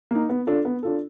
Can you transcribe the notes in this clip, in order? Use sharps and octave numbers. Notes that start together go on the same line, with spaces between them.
A#3 D#4
B3
D4 F4 A4
B3
D4 F4 A4